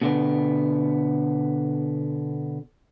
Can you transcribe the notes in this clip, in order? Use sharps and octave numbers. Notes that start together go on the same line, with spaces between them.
B2 D3 B3